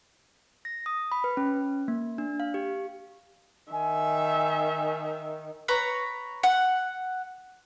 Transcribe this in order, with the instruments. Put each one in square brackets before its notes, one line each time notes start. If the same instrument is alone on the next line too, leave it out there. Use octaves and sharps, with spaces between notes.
[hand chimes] A#6
D#6
B5
B4
C#4
A#3
D4
F5
G4
[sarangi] D#3 [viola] E5 [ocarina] G#5
[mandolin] B4 C#5 A#5
F#5